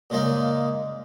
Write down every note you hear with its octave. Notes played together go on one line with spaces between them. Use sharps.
A#2 C#3 G#3 A#3 D#4